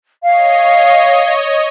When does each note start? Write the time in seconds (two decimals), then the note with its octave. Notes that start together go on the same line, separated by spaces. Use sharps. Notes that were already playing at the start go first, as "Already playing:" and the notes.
0.23 C#5 D#5 F5